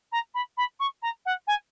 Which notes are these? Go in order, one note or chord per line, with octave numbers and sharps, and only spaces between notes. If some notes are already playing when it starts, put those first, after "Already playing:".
A#5
B5
B5
C#6
A#5
F#5
G#5